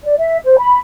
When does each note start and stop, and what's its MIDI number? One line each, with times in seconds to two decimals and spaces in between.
0.04 0.15 74
0.19 0.38 76
0.45 0.56 72
0.58 0.78 83